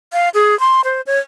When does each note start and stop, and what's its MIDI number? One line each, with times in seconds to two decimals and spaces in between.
0.13 0.29 77
0.34 0.58 68
0.60 0.81 84
0.84 1.01 72
1.06 1.19 73